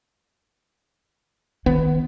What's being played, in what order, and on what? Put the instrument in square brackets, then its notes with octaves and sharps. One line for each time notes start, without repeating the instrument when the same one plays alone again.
[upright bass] D#3 [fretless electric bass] B3